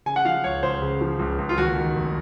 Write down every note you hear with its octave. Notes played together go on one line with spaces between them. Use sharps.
C#3 G#5
F#5
F3 F5
C#2 C#5
C#2 C5
C#3
F3
C#2
C#2
F4
D#2 F#4
D#3
F1